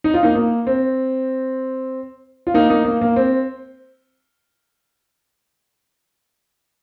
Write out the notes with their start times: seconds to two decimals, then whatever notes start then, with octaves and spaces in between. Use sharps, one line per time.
0.04 D#4
0.14 F4
0.23 A#3 D#4
0.35 A#3
0.67 C4
2.47 F4
2.54 A#3 D#4
2.70 A#3 D#4
2.85 A#3
3.01 A#3
3.16 C4